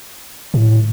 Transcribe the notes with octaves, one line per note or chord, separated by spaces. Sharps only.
A2